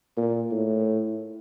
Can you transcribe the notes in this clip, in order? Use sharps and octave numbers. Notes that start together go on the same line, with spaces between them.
A#2
A2